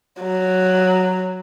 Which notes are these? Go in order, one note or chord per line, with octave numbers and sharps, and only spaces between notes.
F#3